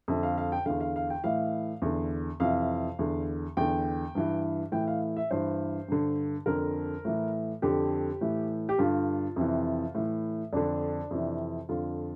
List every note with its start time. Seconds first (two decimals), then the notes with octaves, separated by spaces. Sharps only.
0.08 F2 D3 E5
0.23 F5
0.38 F5
0.52 G5
0.66 E2 D3 F5
0.80 F5
0.96 F5
1.10 G5
1.24 A2 E3 F5
1.82 E2 D3
2.40 F2 C3 E3 F5
2.99 E2 D3
3.57 E2 D3 G5
4.15 G2 E3
4.72 A2 E3 G5
4.88 F5
5.17 E5
5.31 G2 E3 C5
5.88 G2 D3
6.46 F2 D3 A#4
7.05 A2 E3
7.62 F2 D3 G4
8.21 A2 E3
8.69 G4
8.78 G2 D3 F4
9.36 F2 C3 E3
9.95 A2 E3
10.53 F2 D3 D4
11.11 F2 C3 E3
11.69 F2 D3 F4